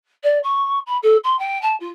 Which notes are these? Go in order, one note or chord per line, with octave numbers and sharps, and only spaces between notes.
D5
C#6
B5
A4
C6
G5
A5
F4